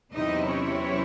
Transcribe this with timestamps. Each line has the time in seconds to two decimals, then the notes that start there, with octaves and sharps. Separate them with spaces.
0.13 E2 C3 F#3 C4 D#4 E4 D#5
0.47 C#4 C#5